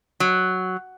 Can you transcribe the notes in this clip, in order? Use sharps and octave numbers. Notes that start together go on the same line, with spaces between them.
F#3